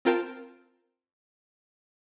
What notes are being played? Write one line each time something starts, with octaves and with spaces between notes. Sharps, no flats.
C4 F4 A#4 G5 A5 C6